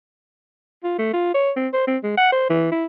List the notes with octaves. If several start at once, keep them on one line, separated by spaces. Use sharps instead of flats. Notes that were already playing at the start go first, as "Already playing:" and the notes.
F4
A3
F4
C#5
C4
C5
C4
G#3
F#5
C5
E3
E4